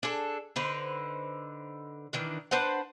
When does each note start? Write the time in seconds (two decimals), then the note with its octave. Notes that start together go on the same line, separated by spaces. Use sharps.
0.03 D4 G#4 A4
0.56 D3 D#4 B4 C5
2.13 D#3 E3 D4
2.51 D4 B4 C5 F#5